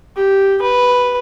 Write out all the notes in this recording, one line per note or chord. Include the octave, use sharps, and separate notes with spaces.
G4
B4